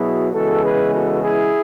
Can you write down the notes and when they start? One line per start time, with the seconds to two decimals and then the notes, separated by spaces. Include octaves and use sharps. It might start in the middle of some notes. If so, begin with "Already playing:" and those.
Already playing: B2 F#3 B3 E4 G#4
0.32 C#3 E3 G#3 B3 F#4 A4
0.63 G#4 B4
0.93 F#4 A4
1.22 E4 G#4